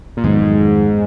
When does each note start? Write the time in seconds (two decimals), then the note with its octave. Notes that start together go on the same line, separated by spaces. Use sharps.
0.17 A#2
0.24 F2 G#2 D#3 F#3 B3